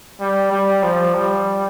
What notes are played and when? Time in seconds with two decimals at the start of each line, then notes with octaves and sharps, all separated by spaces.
0.20 G3
0.52 G3
0.83 F3
1.14 G3